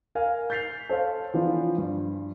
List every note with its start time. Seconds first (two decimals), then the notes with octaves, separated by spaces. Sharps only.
0.15 A#4 F5 G#5
0.50 G6 A6 B6 C7 F7
0.89 A4 C5 C#5 F5
1.34 E3 F3 B3 D4
1.78 G2